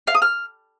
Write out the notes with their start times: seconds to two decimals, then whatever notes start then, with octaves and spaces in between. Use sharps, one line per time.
0.07 F5
0.15 D#6
0.22 F6